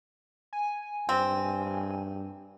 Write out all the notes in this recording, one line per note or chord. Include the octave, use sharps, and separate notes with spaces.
G#5
G2 C4